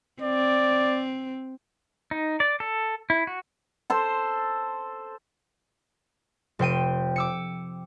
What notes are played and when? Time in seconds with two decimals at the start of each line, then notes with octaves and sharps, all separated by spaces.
0.22 C4 D5
2.11 D#4
2.40 D5
2.60 A4
3.10 E4
3.27 F#4
3.90 A4 C5 C6
6.59 F1 C5 G5 D#7
7.16 D6 E6 C#7